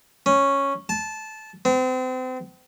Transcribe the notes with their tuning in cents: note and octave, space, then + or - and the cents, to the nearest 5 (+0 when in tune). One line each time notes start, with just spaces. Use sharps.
C#4 -5
A5 -15
C4 -35